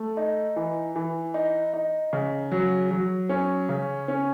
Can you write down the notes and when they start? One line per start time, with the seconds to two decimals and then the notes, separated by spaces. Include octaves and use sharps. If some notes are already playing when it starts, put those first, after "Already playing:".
Already playing: A3
0.17 D#4
0.56 E3
0.96 E3
1.34 D#4
1.73 D#4
2.13 C#3
2.52 F#3
2.91 F#3
3.29 C#4
3.69 C#3
4.08 C#4